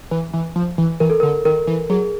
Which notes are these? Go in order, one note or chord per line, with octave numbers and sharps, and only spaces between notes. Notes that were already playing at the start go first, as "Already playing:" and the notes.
E3
E3
F3
E3
E3 A#4
A4
D3 A#4
D#3 A#4
E3
F#3 G#4